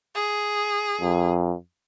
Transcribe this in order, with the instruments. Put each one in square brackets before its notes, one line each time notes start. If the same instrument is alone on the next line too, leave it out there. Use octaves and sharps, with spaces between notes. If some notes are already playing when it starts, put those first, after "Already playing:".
[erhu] G#4
[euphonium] F2